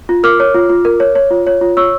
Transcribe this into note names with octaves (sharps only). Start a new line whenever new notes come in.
F4
A#4 D6 F6
C#5
F4
F4
A#4
C#5
C#5
F4
C#5
F4
C#5 C#6 E6